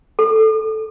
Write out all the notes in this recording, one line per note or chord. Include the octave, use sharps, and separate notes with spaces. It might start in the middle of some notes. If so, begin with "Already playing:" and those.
A4